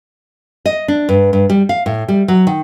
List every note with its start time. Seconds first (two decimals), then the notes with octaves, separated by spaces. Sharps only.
0.66 D#5
0.88 D4
1.09 G2
1.33 G2
1.50 G3
1.69 F5
1.86 A2
2.08 G3
2.28 F#3
2.47 D#3